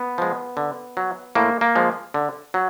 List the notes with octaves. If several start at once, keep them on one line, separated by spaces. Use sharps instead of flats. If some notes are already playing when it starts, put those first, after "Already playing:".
Already playing: B3
F3 G#3
D3
F#3
A2 A#3
A#3
F3 G#3
D3
F#3